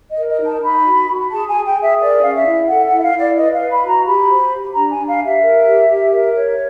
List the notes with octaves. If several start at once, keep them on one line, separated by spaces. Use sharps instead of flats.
D#5
A#4
D#5
D#4
A5
D#4 B5
F#4
F#4
G#4 A5
G#4 G#5
G5
G#4
E5
A#4 D5
C#4 F5
E5
E4
A4 F#5
F#5
E4
E5
F5
E4
D5
B4 D#5
F5
B4
B5
F#4
A#5
G4 B5
C5
G4
D4 A#5
G#5
D4
F5
G4
E5
A#4
G4
G4
A#4
C#5